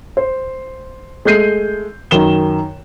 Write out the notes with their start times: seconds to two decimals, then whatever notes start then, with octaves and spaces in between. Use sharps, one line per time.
0.17 C5
1.25 G#3 A3 G6 C7 D#7
2.11 F#2 D#3 E7 G7